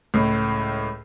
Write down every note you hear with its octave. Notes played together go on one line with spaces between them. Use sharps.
C#2 A2